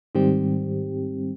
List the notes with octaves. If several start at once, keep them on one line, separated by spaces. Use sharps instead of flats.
G#2 D#3 G3 C4 G4